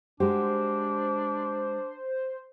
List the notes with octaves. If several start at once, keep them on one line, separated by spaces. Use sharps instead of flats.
G#3 D4 F#4 G4 C5